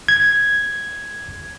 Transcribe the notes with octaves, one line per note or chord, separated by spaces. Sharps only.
G#6